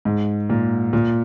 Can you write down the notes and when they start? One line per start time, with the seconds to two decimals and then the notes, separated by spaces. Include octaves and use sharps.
0.05 G#2
0.50 A#2
0.93 A#2